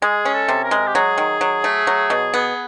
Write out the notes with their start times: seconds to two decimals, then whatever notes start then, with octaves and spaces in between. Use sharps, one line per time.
0.02 G#3 G#4
0.25 C#4
0.34 A4
0.48 C3
0.64 A#4
0.71 G#3
0.87 G4
0.95 F#3 G#4
1.18 D#3
1.41 F#3
1.64 A3
1.87 F#3
2.10 B2
2.34 B3